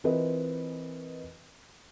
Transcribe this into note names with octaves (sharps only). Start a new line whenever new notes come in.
E3 C4 F4 A#4 B4 D#5